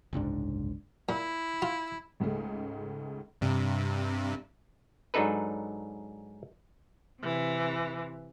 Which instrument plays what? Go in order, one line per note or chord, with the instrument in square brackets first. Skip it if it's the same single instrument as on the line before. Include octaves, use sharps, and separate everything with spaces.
[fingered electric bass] F#1 C2 G#2 D4
[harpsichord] A#2 [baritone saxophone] E4
[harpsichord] F4
[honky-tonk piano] C#2 G#2 C#3 A3
[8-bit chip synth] G2 C3
[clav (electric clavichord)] G#2 F#3 D4 D#4 A4 B4
[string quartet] C3 E3